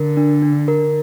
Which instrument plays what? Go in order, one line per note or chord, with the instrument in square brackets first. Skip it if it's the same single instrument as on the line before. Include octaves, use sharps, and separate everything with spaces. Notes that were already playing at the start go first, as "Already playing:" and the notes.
Already playing: [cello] D3 [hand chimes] A#4
[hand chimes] D4
D4
A#4